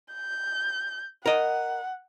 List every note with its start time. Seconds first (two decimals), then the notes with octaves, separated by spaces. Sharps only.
0.13 G6
1.26 A#4 D#5 F#5